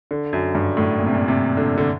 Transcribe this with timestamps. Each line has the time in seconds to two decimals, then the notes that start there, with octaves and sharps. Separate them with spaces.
0.11 D3
0.33 F#2
0.55 G2
0.77 A2
0.99 A#2
1.07 C3
1.14 A#2
1.28 C3
1.57 D3
1.78 D3